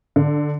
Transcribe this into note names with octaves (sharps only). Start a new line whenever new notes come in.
D3